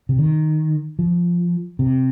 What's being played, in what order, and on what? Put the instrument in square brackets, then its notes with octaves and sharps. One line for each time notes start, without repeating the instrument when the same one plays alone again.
[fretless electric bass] C3
D#3
F3
C3